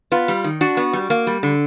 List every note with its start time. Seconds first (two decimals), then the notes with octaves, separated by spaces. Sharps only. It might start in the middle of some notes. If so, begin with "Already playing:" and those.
0.12 B3 F4
0.28 G3
0.44 D#3
0.61 D4 F#4
0.77 B3
0.93 G3
1.10 A#3
1.27 G3
1.43 D3